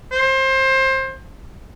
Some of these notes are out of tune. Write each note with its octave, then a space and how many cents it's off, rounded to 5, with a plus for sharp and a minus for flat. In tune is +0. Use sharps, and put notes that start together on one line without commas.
C5 +25